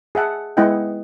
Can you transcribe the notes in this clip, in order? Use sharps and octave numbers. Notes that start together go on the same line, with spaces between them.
G#4 E5 F#5 A5
G#3 B3 E4 D#5 F#5 G5